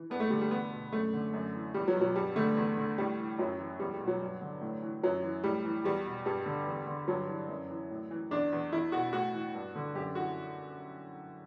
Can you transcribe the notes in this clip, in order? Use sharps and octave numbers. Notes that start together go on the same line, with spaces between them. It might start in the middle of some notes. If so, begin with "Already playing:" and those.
Already playing: E3
G2 B3
A3
D3 G3
G3
E2 B3
B2
F#2 A3
D3
F#2
E3
E2 G3
F#3
B2
F#3
G2 G3
D3 A3
E2
D3
A2 G3
E3
F#2 F#3
E3
E2 G3
G3
B2
F#3
G2
D3
A2
E3
F#2 F#3
E3
A2 G3
E3
E2 G3
B2
G2 G3
D3
E2
D3
G2 F#3
E3
F#2
E3
A2
E3
E2 D4
E2
E2 E4
B2 F#4
A2 F#4
E3
G2
D3
F#2 G4
E3 F#4